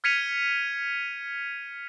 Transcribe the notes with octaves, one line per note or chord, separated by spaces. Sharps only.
F6 G#6 B6 C#7 D#7 F7